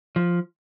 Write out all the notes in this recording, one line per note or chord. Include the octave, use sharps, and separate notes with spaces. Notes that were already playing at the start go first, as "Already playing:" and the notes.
F3